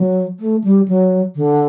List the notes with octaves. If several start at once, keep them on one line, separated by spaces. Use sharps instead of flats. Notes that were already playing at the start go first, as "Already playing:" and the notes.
Already playing: F#3
A3
G3
F#3
D3